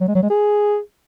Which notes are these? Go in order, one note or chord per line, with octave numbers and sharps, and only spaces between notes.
F#3
G#3
F#3
G#3
G#4